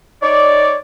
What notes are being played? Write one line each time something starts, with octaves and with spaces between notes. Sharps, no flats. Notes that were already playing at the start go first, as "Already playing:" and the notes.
D#4 C#5 D5